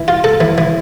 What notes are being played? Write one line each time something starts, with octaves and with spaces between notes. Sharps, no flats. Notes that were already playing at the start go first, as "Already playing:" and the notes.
Already playing: E3
F4
A4
E3
E3